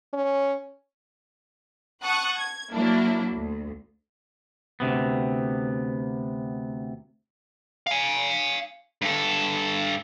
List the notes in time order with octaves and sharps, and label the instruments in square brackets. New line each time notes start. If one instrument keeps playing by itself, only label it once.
[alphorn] C#4
[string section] F#5 A5 C#6 D#6 F#6
G#6
F#3 A#3 D4 E4
D2
[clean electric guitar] D2 C3 B3
[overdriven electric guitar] F5 G#5
G2 A4